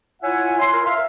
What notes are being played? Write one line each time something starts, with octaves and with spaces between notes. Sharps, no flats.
E4 F4 C#5 E5 F#5 G#5
C6
A#4
E5 F5